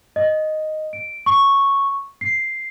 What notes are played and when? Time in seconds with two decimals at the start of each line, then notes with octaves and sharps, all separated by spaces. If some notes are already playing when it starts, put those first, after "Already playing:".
0.16 D#5
0.93 D7
1.26 C#6
2.21 C7